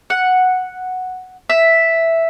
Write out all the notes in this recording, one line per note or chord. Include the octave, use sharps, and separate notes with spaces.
F#5
E5